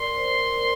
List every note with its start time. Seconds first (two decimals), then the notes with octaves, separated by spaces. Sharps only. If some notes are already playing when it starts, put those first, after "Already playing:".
Already playing: A#4 D5 C6
0.15 C5
0.39 A#4